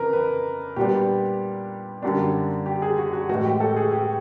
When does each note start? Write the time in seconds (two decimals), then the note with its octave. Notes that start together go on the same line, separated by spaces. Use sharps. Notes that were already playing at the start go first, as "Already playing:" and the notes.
Already playing: F2 C#3 E3 A#4 B4
0.13 B4
0.76 A#2 G3 B3 D4 G4
2.02 F#2 D3 G3 A#3 D4
2.66 G4
2.82 G#4
2.98 F#4
3.13 F#4
3.29 A2 E3 G#3 F#4
3.45 G4
3.60 A4
3.76 G#4
3.92 G4